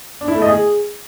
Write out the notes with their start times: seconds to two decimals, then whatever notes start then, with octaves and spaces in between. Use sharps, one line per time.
0.21 D4
0.28 E4
0.35 A3
0.42 D#5
0.49 G#4